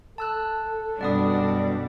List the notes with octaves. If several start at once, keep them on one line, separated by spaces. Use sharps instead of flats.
A4 A5 E6 F#6
F#2 B2 G3 D4 D5 F#5 D#6